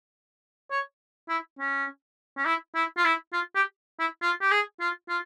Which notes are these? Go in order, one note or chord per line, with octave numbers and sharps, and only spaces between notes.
C#5
E4
C#4
C#4
E4
E4
F4
E4
F4
G4
E4
F4
G4
G#4
F4
F4